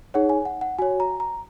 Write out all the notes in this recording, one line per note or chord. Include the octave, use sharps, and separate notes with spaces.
D#4 G#4 C#5 F#5
G#5
F#5
F#5
F#4 C#5 G#5
A#5
A#5